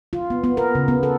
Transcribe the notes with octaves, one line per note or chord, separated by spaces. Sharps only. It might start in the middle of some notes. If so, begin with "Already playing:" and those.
F4
B3
B3
A#4
C#3
B3
A4